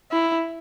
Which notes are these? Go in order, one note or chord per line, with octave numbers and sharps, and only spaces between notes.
E4